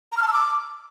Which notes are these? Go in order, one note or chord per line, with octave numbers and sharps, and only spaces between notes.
A#5
F6
A5
E6
D6